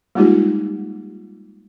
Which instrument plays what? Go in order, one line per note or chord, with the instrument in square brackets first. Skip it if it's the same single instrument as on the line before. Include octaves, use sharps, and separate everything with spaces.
[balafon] G3 G#3 A#3 D#4 F4 G4